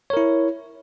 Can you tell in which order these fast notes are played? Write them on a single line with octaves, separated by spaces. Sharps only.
C#5 A#4 E4